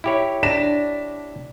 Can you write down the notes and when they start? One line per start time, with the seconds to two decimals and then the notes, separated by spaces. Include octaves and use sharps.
0.04 E4 G4 C#5
0.43 D4 A#6 B6 E7